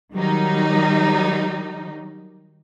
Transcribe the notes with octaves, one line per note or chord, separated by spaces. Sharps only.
D#3 F#3 G3 D#4